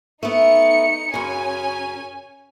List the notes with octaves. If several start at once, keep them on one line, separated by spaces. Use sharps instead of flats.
A3 B3 D#4 C#7
F#2 C#3 C#4 G#5